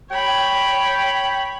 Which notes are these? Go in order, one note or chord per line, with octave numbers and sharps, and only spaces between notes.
C#5 G5 B5